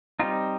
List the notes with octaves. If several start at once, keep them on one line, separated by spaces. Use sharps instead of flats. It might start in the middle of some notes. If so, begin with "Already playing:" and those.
G3 C4 D#4 F4